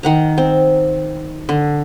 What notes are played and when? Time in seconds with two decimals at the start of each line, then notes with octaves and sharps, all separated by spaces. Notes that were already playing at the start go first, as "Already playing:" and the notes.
0.03 D#3 F#5 A#5
0.38 C4
1.49 D3